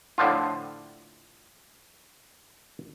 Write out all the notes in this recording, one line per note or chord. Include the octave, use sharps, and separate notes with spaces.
A2 D3 F3 F4